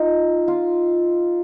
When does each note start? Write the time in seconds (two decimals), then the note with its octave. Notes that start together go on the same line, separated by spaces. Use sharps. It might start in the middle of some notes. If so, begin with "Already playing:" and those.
Already playing: D#4 F4
0.48 F4